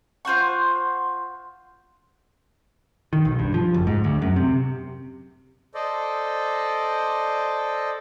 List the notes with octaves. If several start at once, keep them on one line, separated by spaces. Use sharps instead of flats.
F4 C5 F#5 C#6
D#3
B1
G2
F3
F#1
G#2
D2
F#2
C3
A4 C5 D5 D#5